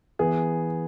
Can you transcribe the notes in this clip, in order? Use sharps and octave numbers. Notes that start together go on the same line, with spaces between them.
E3 B3 G#4